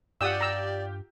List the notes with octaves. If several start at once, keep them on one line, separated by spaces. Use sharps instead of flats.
G2 F4 G4 D5 F#5 D#6 E6
A#5 E6